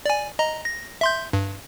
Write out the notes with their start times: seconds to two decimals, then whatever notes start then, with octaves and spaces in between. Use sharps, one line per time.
0.06 D5 G#5
0.39 D#5 A#5
0.65 A#6
1.01 E5 C6 G6
1.33 G2